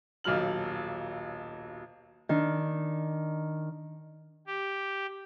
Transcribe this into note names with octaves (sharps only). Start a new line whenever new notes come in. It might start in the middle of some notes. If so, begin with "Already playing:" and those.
D#1 B1 F#3 F6 F#7
D#3 D4
G4